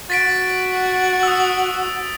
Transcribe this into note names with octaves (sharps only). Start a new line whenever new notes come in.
F#4 A6 B6 D7
D#6 E6